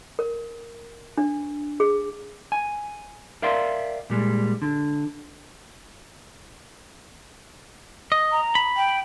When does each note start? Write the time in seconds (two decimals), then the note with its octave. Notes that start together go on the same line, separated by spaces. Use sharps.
0.19 A#4
1.18 D4
1.80 G#4
2.52 G#5
3.42 A#4 D5 E5 F5 G5 C6
4.10 A#2 G3 G#3
4.62 D3
8.12 D#5
8.32 A#5
8.55 B5
8.77 G5